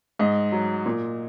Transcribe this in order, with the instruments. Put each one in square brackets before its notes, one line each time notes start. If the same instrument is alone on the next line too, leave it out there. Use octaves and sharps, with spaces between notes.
[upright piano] G#2 D#5
F#3
A#2